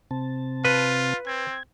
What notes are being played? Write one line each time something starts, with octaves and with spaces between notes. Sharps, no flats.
C3 C4 A5
F4 B4
C4 G#6